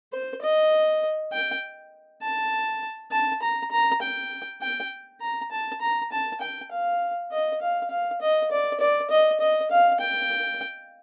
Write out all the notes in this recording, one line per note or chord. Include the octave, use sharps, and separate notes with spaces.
C5
D#5
G5
A5
A5
A#5
A#5
G5
G5
A#5
A5
A#5
A5
G5
F5
D#5
F5
F5
D#5
D5
D5
D#5
D#5
F5
G5